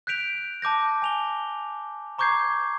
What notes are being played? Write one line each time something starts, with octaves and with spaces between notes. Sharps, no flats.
F#6 G6 B6 D7 F7
A5 D6 G6 A#6
G#5 F7 G7
A#5 C#6 D6 G6 G#6 C7